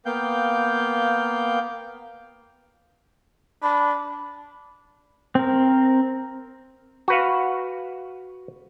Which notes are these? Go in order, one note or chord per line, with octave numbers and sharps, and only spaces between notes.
A#3 B3 F5 G5 G6
D4 B5
C4 A#4
F#4 B4 F5